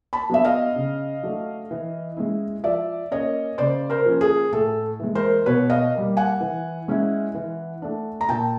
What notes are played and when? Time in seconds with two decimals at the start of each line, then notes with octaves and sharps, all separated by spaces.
0.13 A5 B5
0.30 F#3 B3 D4 E5
0.45 D#5 F5
0.76 C#3
1.23 F#3 A3 D4
1.71 E3
2.17 G#3 C#4 E4
2.64 F3 D5 E5
3.11 A#3 C#4 C#5 D#5
3.58 C#3 C5 D5
3.90 A#4 C5
4.06 F3 A#3 C#4
4.21 G#4
4.52 A2 A4
5.00 E3 G#3
5.15 A#4 C5
5.46 B2 B4 C#5
5.70 D#5 F5
5.93 G3 A#3
6.17 F#5 G#5
6.41 E3
6.88 G#3 C#4 E4
7.35 E3
7.82 A3 D4
8.21 A#5
8.29 A#2 G5 A5